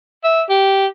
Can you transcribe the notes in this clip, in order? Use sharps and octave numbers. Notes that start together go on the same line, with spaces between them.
E5
G4